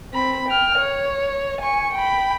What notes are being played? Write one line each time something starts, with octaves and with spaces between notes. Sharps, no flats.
C4 B5
G5 F6
C#5
G#5 C#6
G5 B5